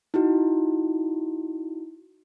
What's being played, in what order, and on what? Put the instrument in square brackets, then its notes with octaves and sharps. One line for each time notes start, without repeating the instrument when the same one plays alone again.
[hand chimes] D#4 E4 F#4